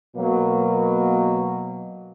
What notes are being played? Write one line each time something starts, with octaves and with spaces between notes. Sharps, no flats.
B2 F#3 A#3